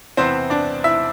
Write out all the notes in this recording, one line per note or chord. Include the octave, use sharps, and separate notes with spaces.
E2 C3 E3 B3 C4 C5
D4 D5
E4 E5